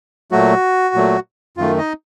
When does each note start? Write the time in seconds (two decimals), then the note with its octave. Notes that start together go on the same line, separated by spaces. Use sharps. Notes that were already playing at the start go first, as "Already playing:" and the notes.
0.32 A#2 F#3 A3 F#4
0.95 A#2 F#3 A3
1.57 F#2 D#3 A3 F4
1.78 D#4 D#5